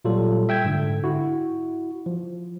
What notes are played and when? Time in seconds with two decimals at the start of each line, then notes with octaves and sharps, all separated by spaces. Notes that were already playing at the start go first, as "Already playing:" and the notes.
0.05 A#2 F#3 G3 F4 A4
0.49 E5 G5 E6 G#6
0.65 G#2 D3
1.04 E4 F#4
2.06 F3